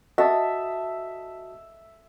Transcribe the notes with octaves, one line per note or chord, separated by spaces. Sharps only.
F#4 E5 A5 D#6